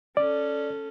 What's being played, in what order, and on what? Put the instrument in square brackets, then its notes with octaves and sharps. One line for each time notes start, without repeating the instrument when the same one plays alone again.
[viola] C#4 A4 [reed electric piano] D5